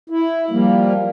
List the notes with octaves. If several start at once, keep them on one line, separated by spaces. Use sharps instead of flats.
E4
F3 G3 A#3